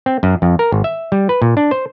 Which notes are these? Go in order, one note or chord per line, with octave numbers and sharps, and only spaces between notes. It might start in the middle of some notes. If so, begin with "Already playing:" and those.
C4
F#2
F2
A#4
G#1
E5
G3
B4
A#2
D4
C5